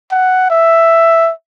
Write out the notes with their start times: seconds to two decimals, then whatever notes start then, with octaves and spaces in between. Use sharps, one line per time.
0.11 F#5
0.50 E5